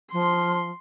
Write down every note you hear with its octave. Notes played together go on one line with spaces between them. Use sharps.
F3 C6